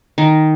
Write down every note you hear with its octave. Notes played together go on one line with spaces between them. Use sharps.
D#3